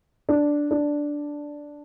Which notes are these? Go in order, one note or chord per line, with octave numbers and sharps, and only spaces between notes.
D4
D4